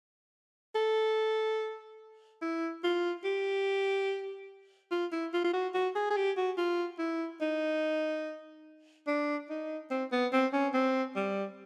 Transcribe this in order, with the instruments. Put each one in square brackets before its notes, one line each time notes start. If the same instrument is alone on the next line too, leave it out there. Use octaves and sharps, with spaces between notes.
[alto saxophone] A4
E4
F4
G4
F4
E4
F4
F4
F#4
F#4
G#4
G#4
G4
F#4
F4
E4
D#4
D4
D#4
C4
B3
C4
C#4
C4
G3